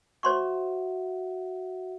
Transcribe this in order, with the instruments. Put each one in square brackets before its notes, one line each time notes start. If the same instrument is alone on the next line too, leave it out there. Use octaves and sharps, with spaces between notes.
[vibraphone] F#4 E5 F#5 [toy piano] C5 C6 C#6